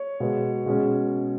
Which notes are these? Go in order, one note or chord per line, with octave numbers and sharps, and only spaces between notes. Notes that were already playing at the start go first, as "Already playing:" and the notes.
Already playing: C#5
B2 G#3 B3
B2 G#3 C#4